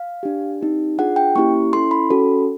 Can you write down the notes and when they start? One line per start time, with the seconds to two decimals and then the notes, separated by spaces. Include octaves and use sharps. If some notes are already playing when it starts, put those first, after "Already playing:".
Already playing: F5
0.23 D4 G4
0.61 C4 D#4 G4
0.98 D4 F4 G#4 F#5
1.16 G5
1.35 A#3 C#4 E4 G4 C#6
1.73 C#4 E4 A4 C6
1.91 B5
2.10 C#4 F#4 A4